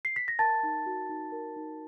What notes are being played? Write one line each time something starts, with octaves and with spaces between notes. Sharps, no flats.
C7
B6
A#6
A#4 A5 A6
D#4
F#4
D#4
A#4
D#4